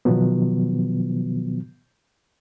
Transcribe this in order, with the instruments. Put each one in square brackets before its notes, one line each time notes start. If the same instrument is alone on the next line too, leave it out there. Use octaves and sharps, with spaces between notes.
[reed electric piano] B2 D#3 F3 F#3 B3